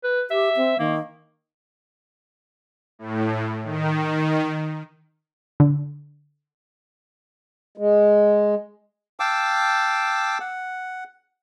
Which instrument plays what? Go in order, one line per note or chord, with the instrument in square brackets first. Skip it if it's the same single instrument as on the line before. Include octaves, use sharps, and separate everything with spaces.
[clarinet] B4
[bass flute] G4 [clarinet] E5
[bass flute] C4
[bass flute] D#3 [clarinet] A#3
[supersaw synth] A2
D#3
[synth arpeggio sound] D3
[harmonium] G#3
[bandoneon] F5 G5 A5 D6 E6
F#5